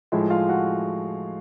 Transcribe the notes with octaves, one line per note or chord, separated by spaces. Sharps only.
A2 F3 G#3 E4 E5
F4 F5
F#4 F#5